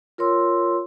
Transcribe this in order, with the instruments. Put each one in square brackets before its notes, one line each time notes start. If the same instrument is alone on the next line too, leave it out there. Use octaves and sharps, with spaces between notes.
[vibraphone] F4 A#4 C#5 C6 E6